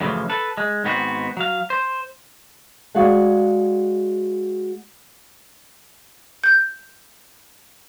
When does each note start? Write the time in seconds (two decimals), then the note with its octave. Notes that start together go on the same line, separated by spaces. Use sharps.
0.01 F#2 A2 C#3 E3 F3
0.30 A4 B4
0.58 G#3
0.84 G#2 D#3 B3 C4 F4 F#4
1.37 F#3 F5
1.70 C5
2.95 G#3 F#4 D5 F5 F#5
6.44 G6